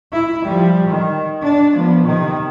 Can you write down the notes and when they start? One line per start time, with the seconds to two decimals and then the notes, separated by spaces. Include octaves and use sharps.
0.13 E4
0.46 F3 G3
0.88 D#3
1.43 D4
1.74 F3 B3
2.05 C3 D#3